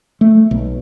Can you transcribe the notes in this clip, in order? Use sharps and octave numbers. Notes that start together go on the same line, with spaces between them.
A3
B1